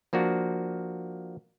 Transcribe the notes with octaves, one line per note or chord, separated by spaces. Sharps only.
F3 A#3 D4 F#4